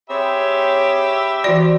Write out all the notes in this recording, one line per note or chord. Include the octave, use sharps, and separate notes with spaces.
C4 G4 G#4 C#5 E5 B5
E3 F#4 D5